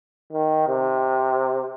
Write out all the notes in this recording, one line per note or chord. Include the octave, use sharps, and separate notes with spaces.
D#3
C3